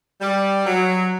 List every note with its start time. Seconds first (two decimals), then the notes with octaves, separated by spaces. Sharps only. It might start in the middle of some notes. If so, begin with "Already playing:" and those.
0.21 G3
0.66 F#3